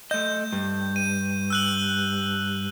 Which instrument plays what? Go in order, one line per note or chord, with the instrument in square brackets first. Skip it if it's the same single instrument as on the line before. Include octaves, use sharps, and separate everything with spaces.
[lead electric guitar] A3 D#5 [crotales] G6
[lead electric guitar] G2
[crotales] D#7
E6 F#6 F#7